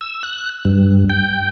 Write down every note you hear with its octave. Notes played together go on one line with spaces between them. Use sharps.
E6
F#6
G2
G5